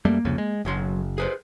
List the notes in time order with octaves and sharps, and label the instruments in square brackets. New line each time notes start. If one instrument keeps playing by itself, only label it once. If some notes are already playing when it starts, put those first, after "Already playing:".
[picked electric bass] F#2 G3 A3 [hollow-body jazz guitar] A#3
[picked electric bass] C2 F2 C#3
G#3
[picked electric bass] F#1 [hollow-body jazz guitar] B1 F#3 C6
[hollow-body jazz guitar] G#4 B4 C5